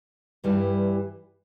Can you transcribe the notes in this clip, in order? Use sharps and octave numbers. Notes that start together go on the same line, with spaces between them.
G2 E3 G3